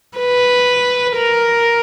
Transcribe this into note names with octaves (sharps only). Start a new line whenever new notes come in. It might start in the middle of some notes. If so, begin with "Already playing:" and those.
B4
A#4